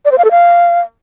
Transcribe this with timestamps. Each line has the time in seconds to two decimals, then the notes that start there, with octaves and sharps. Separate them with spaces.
0.05 D5
0.12 C5
0.18 F5
0.25 A4
0.31 F5